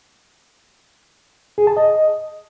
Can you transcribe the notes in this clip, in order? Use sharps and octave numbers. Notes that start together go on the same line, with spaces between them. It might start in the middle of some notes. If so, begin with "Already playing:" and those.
G#4
A5
D#5